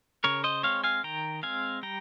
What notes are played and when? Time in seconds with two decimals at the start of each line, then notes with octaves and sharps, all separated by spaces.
0.24 C#3 A#4 C#5
0.44 C5 D#5
0.63 G#3 C4 C#5 F5
0.84 F5 G#5
1.04 D#3 G5 A#5
1.43 G#3 C4 F5 G#5
1.83 G3 G5 A#5